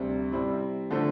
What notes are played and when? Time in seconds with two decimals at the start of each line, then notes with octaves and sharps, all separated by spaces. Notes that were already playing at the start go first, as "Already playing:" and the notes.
Already playing: D2 C3 G3 C4
0.32 C3 G3 C4 E4
0.91 D3 F3 A3 C4